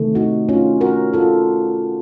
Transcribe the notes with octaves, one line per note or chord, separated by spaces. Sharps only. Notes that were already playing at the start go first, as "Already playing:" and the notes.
Already playing: C3 D#3 A3
D#4 F#4
C#4 F4
F#4 A#4
F4 A4